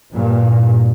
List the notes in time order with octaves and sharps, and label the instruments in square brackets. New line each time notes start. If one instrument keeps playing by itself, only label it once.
[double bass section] G2 A#2